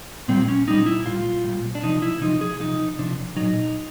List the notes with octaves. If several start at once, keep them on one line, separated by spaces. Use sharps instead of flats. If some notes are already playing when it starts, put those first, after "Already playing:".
A#2 G3 C4
C#4
A#2 G3 D#4
E4
A#2 G3 F4
A#2 G3
D4
C3 F3 D#4
E4
C3 F3 D#4
G#4
C3 F3 D#4
C3 F3 D4
A#2 F#3 D#4